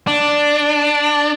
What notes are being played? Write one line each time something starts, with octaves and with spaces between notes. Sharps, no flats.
D4